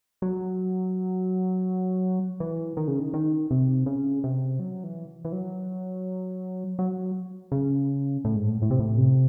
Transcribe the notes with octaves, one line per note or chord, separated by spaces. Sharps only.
F#3
E3
D#3
C#3
D#3
D#3
C3
C#3
C3
F#3
E3
E3
F#3
F#3
C#3
A2
G#2
A2
A2
C3
A2
C3